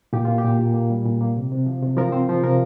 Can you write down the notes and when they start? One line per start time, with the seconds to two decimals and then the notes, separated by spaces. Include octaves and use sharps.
0.13 A#2 G4
0.25 A#3 F4
0.38 G4
0.44 A#2
0.59 A#2
0.74 A#3
0.90 G3
1.06 A#2
1.21 A#3
1.36 C3
1.52 C3
1.66 F3
1.83 C3
1.97 F3 A#4
2.12 C4 C5
2.29 F3
2.43 C3 A#4